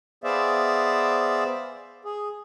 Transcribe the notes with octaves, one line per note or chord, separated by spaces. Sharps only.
B3 G#4 C5 D5 E5 F5
G#4